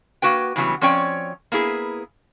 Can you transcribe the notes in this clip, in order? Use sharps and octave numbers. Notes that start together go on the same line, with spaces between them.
A#3 F#4 B4 G5
A2 C#3 E3 F#3 G3 B3
F3 C4 C#4 C#5 D5 G5
A#3 B3 E4 G#4